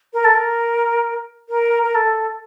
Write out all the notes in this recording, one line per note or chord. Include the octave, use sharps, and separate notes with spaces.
A#4
A4
A#4
A#4
A#4
A4